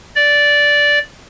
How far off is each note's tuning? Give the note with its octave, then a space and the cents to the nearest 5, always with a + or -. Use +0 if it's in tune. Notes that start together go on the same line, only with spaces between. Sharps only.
D5 -10